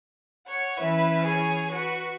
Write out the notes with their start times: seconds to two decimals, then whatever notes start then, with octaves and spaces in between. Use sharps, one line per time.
0.47 C#5 F#5
0.78 E3 C#4 B4 E5
1.25 G#4 C#5
1.71 F#4 B4